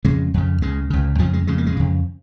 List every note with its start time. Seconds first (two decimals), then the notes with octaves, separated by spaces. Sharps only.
0.05 F2 C#3 G#3
0.34 F2 C#3
0.62 C#2 C#3 G#3
0.90 C#2 C#3
1.19 F2 F3
1.22 C#3
1.33 G#3
1.47 F2 C#3 G#3
1.58 A#3
1.66 G#3
1.77 F2 C#3